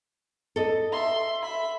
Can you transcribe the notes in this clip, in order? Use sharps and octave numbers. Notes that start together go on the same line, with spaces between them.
A4 D#5
E5 C6
E5 B5